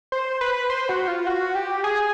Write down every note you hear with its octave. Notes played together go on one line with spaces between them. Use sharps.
C5
B4
C5
F#4
F4
F#4
G4
G#4